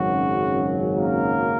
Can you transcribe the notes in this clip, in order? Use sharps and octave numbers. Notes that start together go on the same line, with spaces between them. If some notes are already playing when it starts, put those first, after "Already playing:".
Already playing: G#1 F#2 C#3 F#3 F#4
A#3 A#4